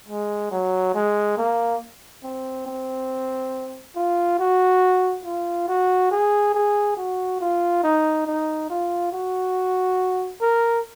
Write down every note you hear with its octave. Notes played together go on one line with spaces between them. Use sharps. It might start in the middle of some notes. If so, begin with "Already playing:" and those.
G#3
F#3
G#3
A#3
C4
C4
F4
F#4
F4
F#4
G#4
G#4
F#4
F4
D#4
D#4
F4
F#4
A#4